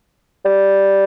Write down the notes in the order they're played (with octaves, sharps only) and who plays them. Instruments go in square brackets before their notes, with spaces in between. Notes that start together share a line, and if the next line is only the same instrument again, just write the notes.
[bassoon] G3